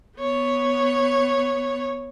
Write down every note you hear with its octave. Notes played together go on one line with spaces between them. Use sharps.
B3 C#5